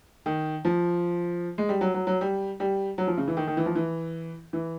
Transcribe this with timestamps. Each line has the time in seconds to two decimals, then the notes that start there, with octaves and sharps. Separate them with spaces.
0.26 D#3
0.65 F3
1.58 G#3
1.69 G3
1.81 F#3
1.94 F#3
2.07 F#3
2.21 G3
2.60 G3
2.98 F#3
3.07 F3
3.17 C#3
3.28 E3
3.37 D#3
3.47 D#3
3.57 E3
3.66 F3
3.75 E3
4.53 E3